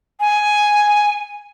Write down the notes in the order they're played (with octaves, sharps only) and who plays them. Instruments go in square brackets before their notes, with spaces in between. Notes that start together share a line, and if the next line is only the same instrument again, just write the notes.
[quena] G#5